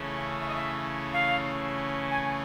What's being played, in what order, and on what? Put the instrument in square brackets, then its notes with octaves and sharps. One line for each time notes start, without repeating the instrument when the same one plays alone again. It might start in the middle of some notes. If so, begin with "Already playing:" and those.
Already playing: [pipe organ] C#3 E3 A3 C#4
[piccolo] E5
E5
D#5
E5
F5
G#5